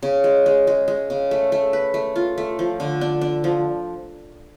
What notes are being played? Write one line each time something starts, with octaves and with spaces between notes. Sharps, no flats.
C#3
G#3
G#3
G#3
G#3
C#3
A3
A3
B4
A3
F4
A3
F3
D3
D4
D4
F3